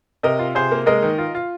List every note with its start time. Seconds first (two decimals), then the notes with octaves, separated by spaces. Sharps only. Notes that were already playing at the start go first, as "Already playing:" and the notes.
0.23 C3 A#4 D#5
0.39 F4
0.55 C3 G#4 C5
0.71 A#3
0.86 G#3 A#4 D#5
1.02 D#3
1.18 F4
1.35 F4